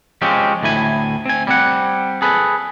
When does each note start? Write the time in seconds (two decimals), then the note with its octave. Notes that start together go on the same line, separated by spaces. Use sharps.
0.22 F3 G#3 C4 C#4 G4
0.63 D2 A2 E4 G#5
1.26 C4 G#5
1.47 G3 C4 F#5
2.22 G#4 A4 B4